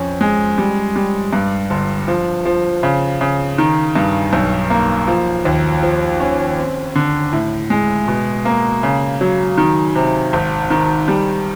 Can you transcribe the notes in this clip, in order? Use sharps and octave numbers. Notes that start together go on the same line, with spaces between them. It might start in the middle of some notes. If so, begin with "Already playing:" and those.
Already playing: F2 C#4
G#3
G3
G3
G2
G1
F3
F3
C#3
C#3
D#3
G2
B1
A#3
F3
D#2
F3
C#4
C4
D3
A2
G#3
B2
A#3
C#3
F#3
D#3
C3
G#1
D#3
G3